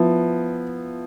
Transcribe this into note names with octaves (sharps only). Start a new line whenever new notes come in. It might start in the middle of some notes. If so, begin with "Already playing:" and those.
Already playing: F3 B3 E4